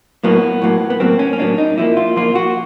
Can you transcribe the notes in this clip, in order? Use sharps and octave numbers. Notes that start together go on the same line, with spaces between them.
A2 F#3 A#3 B3
A2 F#3 A#3
B3
A2 F#3 A#3 C4
C#4
C#4
A2 F#3 A#3 D4
D#4
A#2 F3 A#3 E4
F4
A#2 F3 A#3 F4
F#4